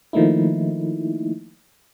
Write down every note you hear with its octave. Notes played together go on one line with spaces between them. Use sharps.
D#3 F3 A3 A#3 D#4 E4